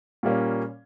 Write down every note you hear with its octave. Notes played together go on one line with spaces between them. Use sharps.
A#2 G3 A#3 C#4